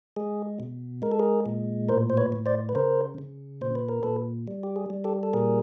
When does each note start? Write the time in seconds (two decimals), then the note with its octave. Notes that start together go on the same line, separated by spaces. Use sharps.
0.16 G#3 G#4
0.60 B2
1.02 G#3 A#4
1.12 A4
1.19 G#4 A#4
1.46 A#2
1.89 A2 A#4 C5
2.10 C5
2.17 B4 C#5
2.32 A2
2.46 C5 D5
2.69 B4
2.75 C#3 A#4 C5
3.18 C#3
3.61 A#2 C5
3.75 B4
3.89 A#4
4.03 A#2 A4 B4
4.47 G3
4.63 G4
4.76 G#4
4.90 G3
5.04 G4 A4
5.23 A4
5.33 A#2 G#4 A#4